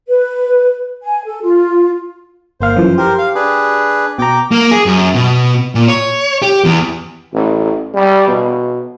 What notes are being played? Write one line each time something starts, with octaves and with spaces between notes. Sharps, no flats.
B4
G#5
A4
F4
G1 A#3 C5 F5
F#2 E3 F3
G4 A#4 C5
F5
D4 G#4 B4
B2 G5 A#5 D6
A#3
G#4
F#2
B2
A#2
C#5
G4
E2
A1
G3
B2